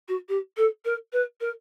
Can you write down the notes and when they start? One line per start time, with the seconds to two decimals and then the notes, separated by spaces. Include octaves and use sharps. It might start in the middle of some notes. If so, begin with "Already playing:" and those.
0.08 F#4
0.28 G4
0.57 A4
0.85 A#4
1.12 B4
1.40 A#4